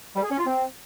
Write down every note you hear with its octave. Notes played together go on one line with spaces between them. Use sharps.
G3
G#4
C#4
F4
C4